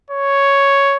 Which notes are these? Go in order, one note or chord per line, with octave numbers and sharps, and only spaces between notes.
C#5